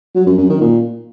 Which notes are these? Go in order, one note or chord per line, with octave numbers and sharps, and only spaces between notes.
F#3
F#2
F#2
D#3
A#2